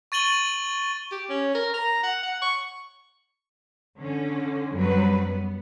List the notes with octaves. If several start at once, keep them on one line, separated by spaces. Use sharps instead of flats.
C#6 A6 D#7 F#7 G7
G4
C#4
A#4
A#5
F#5
F#5
C#6
D3 C#4
F#2 F#3 G3 C4 B4
B3